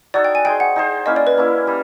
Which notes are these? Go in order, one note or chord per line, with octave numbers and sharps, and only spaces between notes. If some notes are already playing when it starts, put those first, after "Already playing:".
D#4 F#4 A4 C#5 D5
G5
G#5
D#4 G#4 C5 G5
F#5
D#4 G#4 C5
A#3 C#4 E4 D#5
D5
B4
A#3 C#4 E4
G3